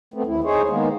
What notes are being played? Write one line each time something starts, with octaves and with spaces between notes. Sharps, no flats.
A3 B3 C4
D#2 E4
D#4 G#4 C5 C#5
D#3 G#3 A#3 B3